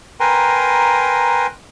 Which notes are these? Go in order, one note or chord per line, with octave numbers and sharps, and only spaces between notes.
A#4 B4 G5 G#5 A#5 C6